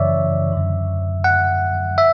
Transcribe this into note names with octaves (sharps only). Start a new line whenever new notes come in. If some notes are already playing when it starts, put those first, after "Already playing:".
Already playing: F#2 C#3 E3 C#5 D5 E5
F#2 D3
F#5
E5